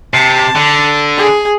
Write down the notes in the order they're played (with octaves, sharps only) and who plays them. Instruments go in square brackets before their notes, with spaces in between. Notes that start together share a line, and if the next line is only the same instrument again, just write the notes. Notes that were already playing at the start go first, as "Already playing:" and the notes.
[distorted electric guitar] C3 [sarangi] A5
[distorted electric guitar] D3
[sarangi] G#4